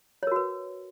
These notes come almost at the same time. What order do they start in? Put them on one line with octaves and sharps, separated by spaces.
C#5 A#4 F#4 B4